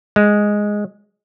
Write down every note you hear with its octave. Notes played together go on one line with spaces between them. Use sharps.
G#3